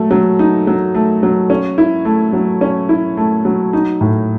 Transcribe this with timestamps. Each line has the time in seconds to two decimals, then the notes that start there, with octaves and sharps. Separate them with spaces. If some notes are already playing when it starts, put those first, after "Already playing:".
Already playing: F#3 A3
0.11 F#3
0.39 D#4
0.67 F#3
0.95 A3
1.23 F#3
1.50 C#4
1.78 E4
2.05 A3
2.33 F#3
2.61 C#4
2.89 E4
3.17 A3
3.45 F#3
3.73 D#4
4.01 A2